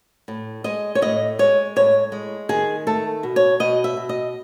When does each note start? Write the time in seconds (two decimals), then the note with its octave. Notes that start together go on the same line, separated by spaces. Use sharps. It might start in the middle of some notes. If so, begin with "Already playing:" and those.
0.28 A2
0.64 G#3 D#5
0.95 C#5
1.02 A2 D#5
1.39 G#3 C#5
1.76 A2 C#5
2.12 G#3
2.49 D#3 G#4
2.87 A3 A4
3.23 B2
3.36 C#5
3.60 B2 D#5
3.84 E5
3.97 B2
4.09 D#5